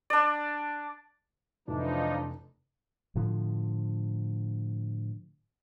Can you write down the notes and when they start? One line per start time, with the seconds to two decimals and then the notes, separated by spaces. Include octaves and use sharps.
0.10 D4 D5
1.68 F1 E3 F3 D4 D#4
3.15 A2 D3 F3